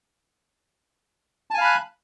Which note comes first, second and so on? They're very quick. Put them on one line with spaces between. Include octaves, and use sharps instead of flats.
A5 G#5 F5 B5 F#6